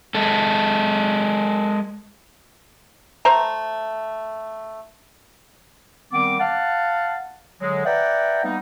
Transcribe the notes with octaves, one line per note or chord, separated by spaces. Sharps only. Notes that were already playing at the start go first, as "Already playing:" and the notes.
G#3 A4
A3 C5 A#5
D#3 G3 B3 C4 D6
F5 F#5 A5
D3 F#3 G#3
B4 D5 E5 F#5 G5 A#5
G3 A#3 B3 D#4